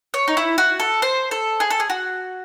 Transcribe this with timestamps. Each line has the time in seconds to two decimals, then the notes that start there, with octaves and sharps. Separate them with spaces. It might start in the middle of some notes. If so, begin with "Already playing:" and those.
0.14 C#5
0.28 D#4
0.37 E4
0.58 F#4
0.80 A4
1.02 C5
1.31 A4
1.60 G#4
1.70 A4
1.80 G#4
1.90 F#4